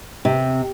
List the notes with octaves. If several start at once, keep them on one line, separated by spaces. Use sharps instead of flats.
C3